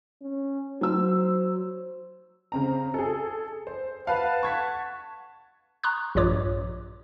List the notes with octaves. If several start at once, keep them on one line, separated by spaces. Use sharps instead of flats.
C#4
F#3 C5 E6
C#3 C4 A#5
G#4 A4
C5
B4 F5 F#5 A5
C#6 G#6 B6
A#5 C6 C#6 D#6 F#6
A#1 G2 A#2 F4 C#5 D6